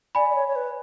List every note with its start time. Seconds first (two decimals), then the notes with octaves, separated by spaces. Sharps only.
0.15 D5 G#5 B5
0.30 D5
0.35 C#5
0.48 C#5
0.56 B4